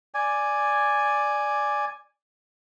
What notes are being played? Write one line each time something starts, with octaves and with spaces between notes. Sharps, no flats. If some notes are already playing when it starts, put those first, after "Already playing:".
D5 G#5